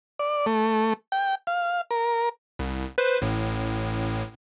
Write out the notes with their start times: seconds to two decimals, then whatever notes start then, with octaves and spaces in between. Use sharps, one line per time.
0.19 D5
0.46 A3
1.12 G5
1.47 F5
1.91 A#4
2.59 C2
2.98 B4 C5
3.22 A1 A2